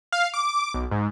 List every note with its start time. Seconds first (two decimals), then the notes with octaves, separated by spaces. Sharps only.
0.12 F5
0.34 D6
0.74 B1
0.91 G#2